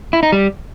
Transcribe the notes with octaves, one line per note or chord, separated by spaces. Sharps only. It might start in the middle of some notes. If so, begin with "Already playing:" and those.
E4
D#4
G3